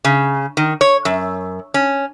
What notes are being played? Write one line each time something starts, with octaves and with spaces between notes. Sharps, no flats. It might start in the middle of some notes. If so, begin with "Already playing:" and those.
C#3
D#3
C#5
F#2
C#4